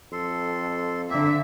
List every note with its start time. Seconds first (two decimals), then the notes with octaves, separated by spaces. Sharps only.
0.12 F2 A4 C6
1.09 D3 A#3 C4 E5